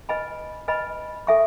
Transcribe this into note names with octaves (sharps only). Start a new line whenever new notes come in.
B4 D#5 G#5 B5
B4 D#5 G#5 B5
A4 E5 G#5 C#6